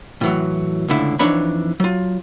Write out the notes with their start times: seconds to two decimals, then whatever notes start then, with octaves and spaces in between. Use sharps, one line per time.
0.21 A2 E3 F#3
0.88 C#2 A2 D3 E4
1.19 F2 E3 D4 D#4 C#5 B5
1.80 F#3 F4